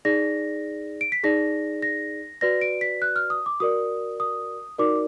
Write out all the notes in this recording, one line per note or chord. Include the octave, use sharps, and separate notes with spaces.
D#4 G#4 D5 A#6
D7
B6
D#4 G#4 D5 A#6
A#6
F#4 B4 D5 A#6
D7
B6
F#6
F6
D#6
D6
F#4 A#4 D5 D#6
D#6
D#4 F#4 A#4 D5 D6